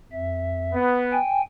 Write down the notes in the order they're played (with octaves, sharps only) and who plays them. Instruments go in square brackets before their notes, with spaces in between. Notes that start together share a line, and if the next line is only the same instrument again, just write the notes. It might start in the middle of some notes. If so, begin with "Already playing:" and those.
[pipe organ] F2 E5
[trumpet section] B3
[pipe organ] G5 G#5